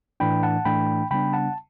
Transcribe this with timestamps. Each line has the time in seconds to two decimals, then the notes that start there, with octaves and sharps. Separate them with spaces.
0.20 A2 E3 A3 D4 G5 B5
0.43 F#5 A5
0.65 A2 E3 A3 D4 G5 B5
1.11 C#3 G3 B3 D4 G5 B5
1.33 F#5 A5